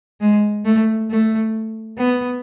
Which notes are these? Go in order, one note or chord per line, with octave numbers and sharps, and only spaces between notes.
G#3
A3
A3
B3